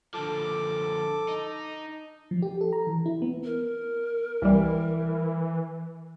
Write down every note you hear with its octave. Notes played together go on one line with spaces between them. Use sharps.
D3 F3 A4 D6
D#4
F3
G4
A4
A#5
E3
E4
B3
A#4
C2 E3 G3